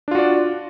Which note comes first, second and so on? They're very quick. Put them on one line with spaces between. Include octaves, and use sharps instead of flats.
D4 F4 F#4 D5